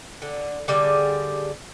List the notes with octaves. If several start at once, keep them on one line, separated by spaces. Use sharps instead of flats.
D3
D3 G3 G#4